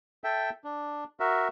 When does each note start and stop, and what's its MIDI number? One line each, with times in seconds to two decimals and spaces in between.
0.24 0.50 69
0.24 0.50 76
0.24 0.50 79
0.64 1.04 62
1.20 1.48 66
1.20 1.48 70
1.20 1.48 76